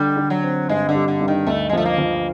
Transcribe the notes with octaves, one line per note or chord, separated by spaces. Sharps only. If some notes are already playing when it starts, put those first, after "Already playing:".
Already playing: D3 G3
D3
F#3
C4
G2 G#3
D3
G3
D3
G2
D#3
D2 A3
G#3
F3 A3
A#3
F3